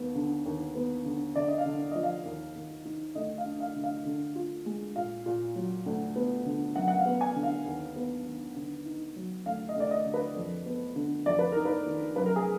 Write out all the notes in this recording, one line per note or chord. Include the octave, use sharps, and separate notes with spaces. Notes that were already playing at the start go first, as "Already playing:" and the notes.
Already playing: D#2 B3
D3
D#2
B3
D3
D3 D5
D#5
F5
D3
F3 D#5
F5
D#2
D#2
D#3
D2 D#5
F5
D4
F5
D3
F5
D3
F4
G#3
A#2 F5
A#2
F#3
D2
B3
D3
F#2 F#5
F#5
F5
B3
G#5
D3
F5
D#2
B3
D#3
D3
D#4
F#3
D2 F5
D#5
D2 D5
D#5
D3
B4
F2
B3
D3
F2 D5
B4
D#4 A#4
B4
D#3
F#2 B4
A#4
G#4